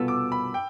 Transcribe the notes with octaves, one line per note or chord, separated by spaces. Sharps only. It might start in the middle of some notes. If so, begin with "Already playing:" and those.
Already playing: C2 B2 B3 F4 A4 E6
D6
B5
G5